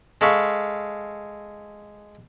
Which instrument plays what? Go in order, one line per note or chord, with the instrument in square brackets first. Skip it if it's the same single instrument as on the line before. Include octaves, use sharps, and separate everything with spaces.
[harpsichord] G#3 A4 F5 B5 C#6